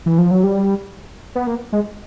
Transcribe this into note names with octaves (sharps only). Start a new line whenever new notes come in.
E3
F3
F#3
G3
B3
A#3
G#3